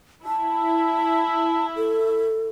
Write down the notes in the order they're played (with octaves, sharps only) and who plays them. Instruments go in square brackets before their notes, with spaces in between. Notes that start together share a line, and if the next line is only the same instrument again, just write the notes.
[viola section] E4 [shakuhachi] A5
[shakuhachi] A4